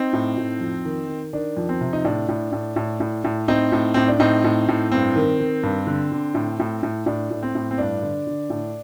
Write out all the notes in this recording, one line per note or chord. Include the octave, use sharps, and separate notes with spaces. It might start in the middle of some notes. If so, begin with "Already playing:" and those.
Already playing: C4 D#4
A2
A2
F2
D#3
D#3
D#3 D4
F2
C4
C3
D#4
A2 D4
A2
A2
A2
A2
A2
A2 C4 D#4
A2
A2 C4
D4
A2 C4 D#4
A2
A2
G2 C4
D#3
D#3
G2
D3
D3
A2
A2
A2
A2 D4
A2
C4
A2
C4
G2 D4
D3
D3
A2